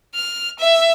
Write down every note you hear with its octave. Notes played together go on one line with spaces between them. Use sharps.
F6
E5